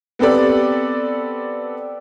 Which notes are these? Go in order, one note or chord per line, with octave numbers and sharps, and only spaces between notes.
B3 C4 G4 A4 D5